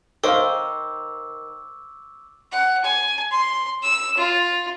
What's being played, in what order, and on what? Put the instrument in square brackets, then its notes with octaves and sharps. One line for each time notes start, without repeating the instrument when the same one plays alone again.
[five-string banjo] D#3 [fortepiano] C5 F5 [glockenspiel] C#6 D6 E6
[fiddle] F#5
G#5
C6
E6
F4